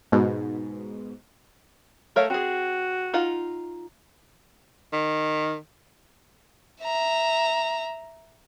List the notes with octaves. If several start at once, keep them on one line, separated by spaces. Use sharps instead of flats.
G#2 B2
A3 A#4 C#5 F5
C4 F#4 G#4
D#4 F4 F#5
D#3
E5 A#5